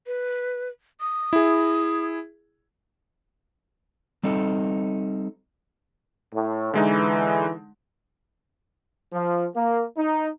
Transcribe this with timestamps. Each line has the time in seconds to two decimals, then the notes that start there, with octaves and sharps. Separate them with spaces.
0.07 B4
1.01 D#6
1.33 E4 G#4
4.23 G3 C4 D#4 A4
6.34 A2
6.74 D3 E3 G#3 D#4
9.13 F3
9.55 A#3
9.98 D#4